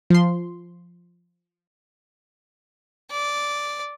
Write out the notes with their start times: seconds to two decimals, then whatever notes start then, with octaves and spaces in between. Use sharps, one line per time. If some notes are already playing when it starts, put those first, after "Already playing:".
0.10 F3 C6
3.11 D5